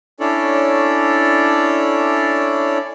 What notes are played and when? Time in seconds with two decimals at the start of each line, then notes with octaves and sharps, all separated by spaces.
0.20 C#4 D4 E4 A4 C#5 D5